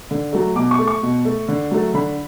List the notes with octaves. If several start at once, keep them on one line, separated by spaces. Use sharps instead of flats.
D3
F#3 A3
B2 D6
C#6
A3
C#6
B2
A3
D3
F#3 A3
D3 B5